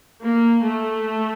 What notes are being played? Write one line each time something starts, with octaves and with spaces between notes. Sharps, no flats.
A#3
A3